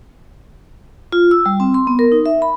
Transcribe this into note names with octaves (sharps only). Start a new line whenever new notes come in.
F4
E6
G3
C4
C6
B3
A#4
D#4
E5
B5